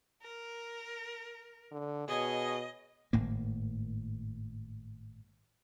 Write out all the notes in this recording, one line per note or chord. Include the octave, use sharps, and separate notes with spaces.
A#4
D3
B2 G#4 C#5 D#5
G#1 A2 A#3